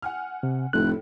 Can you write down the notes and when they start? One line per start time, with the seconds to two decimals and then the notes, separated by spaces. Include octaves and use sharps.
0.02 F#5 G#5 F6
0.43 C3
0.73 F1 A2 E4 A4 F#6